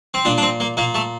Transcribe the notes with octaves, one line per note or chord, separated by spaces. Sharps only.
C4
A#2 D4
D4
C4
A#3
A#2 A#3
A3